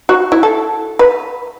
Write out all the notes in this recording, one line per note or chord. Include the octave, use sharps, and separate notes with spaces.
F#4
E4
A4
B4